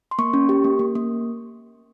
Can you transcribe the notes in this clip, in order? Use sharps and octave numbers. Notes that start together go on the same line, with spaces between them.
C6
A#3 C#6
C#4
G4
A#3
A#3
A#3